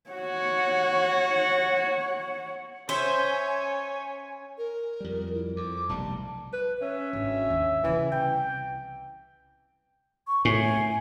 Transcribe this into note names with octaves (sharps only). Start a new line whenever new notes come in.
F#4 C#5 F#5
C#4 C5 C#5 E5 G#5
A#4
F2 G3
E4
F2 D6
F1 B1 G3 A5
B4
C#4 E5
G#1 D4
D#2
A#2 C#3 E3
C2 G5
C#6
A2 G#5